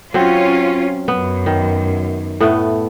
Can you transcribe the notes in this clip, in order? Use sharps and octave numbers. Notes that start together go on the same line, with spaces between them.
F#3 C4 C#4 F4
F#2 B3
D#3
A2 A3 B3